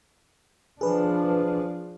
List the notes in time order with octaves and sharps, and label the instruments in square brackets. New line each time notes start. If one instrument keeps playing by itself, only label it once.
[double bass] F3 D4 [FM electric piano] G#4 B4